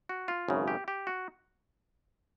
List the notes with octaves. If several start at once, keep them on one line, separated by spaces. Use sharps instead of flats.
F#4
F4
G#1 F#2 C#3 E3
G4
G4
F#4